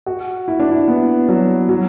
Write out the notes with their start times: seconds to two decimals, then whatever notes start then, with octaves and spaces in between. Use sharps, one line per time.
0.06 F#4
0.48 E4
0.60 D4
0.71 E4
0.88 B3
1.28 F#3
1.69 F#3